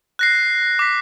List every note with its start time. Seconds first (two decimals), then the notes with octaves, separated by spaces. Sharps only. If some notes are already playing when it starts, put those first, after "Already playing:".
0.19 F#6 A#6 C7
0.79 D6 B6